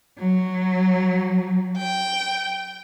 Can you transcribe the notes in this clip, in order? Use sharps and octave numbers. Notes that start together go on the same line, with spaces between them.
F#3
G5